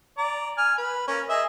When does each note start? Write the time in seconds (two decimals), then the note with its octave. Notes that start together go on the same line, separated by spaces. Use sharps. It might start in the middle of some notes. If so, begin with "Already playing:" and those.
0.18 D5 A#5
0.58 G#5 F6
0.78 B4
1.08 A#3 C#4
1.29 G#4 D#5 E5